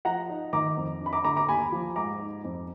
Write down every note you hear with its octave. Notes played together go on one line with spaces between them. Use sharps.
F3 F#5 A#5
D#4
D#3 A#5 D6
F2
D4 B5
A#5 D6
D3 A#5 D6
A#5 D6
D#2 G#5 B5
F3
G#2 A#5 D6
D#4
F2